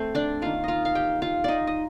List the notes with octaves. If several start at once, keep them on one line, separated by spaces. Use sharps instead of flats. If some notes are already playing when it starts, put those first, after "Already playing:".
Already playing: A3 C4 A4 C5
D4 D5
D#3 A#3 F4 F5
F4 D#5 F5
F5
G4 G5
F4 F5
D#4 D5 D#5
D#5